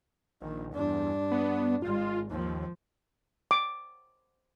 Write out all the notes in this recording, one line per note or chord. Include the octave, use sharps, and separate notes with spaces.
A#1 D#3
E2 G2 D4
B3
G#1 G#3 F4
D#2 F3
D6